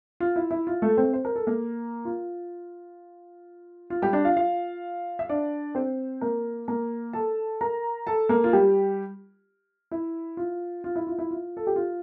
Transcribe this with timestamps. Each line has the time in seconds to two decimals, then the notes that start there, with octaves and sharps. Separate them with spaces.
0.20 F4
0.36 E4
0.51 E4
0.67 F4
0.82 A3 A4
0.97 C4 C5
1.13 C5
1.25 A#4
1.36 A4
1.47 A#3 A#4
2.05 F4
3.90 F4
4.02 G3 G4
4.13 D4 D5
4.24 F4 F5
4.37 F4 F5
5.19 E5
5.29 D4 D5
5.75 C4 C5
6.21 A#3 A#4
6.68 A#3 A#4
7.13 A4 A5
7.61 A#4 A#5
8.07 A4 A5
8.29 A#3 A#4
8.44 F4
8.53 G3 G4
9.91 E4
10.37 F4
10.84 F4
10.96 E4
11.07 F4
11.19 E4
11.31 F4
11.57 A4
11.67 G4
11.76 F4